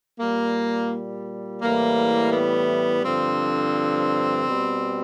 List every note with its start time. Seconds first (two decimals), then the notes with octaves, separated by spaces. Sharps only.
0.20 A#2 G3 A#3
1.62 A2 E3 G3 A#3
2.32 B3
3.04 G2 D3 F3 C4
4.46 B2 G3